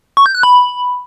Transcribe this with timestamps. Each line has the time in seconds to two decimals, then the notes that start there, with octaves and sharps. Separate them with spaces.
0.17 C#6
0.26 G6
0.35 F#6
0.43 B5